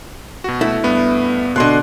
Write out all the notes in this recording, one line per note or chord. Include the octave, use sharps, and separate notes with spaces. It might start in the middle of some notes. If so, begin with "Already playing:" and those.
B2 F#4
A3 E4
G2 B3
B2 D3 D#5 C6 F#6